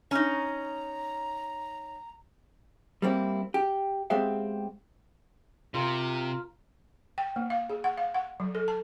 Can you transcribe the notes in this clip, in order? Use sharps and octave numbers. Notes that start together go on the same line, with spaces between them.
C#4 D#4 A#5
G3 A#3 C4 E4
G4
G#3 B3 C4 G4 E5 F5
C3 F4 A#4
G5
A#3
F5
G#4
F#5
F5
F#5
F#3
A4
A5